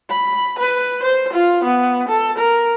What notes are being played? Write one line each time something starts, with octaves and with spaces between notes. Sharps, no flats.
B5
B4
C5
F4
B3
A4
A#4